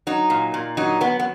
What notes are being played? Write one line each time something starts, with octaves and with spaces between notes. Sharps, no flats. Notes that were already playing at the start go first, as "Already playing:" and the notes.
F#3 D#4
A#2
A#2
F#3 D#4
F#3 B3
B3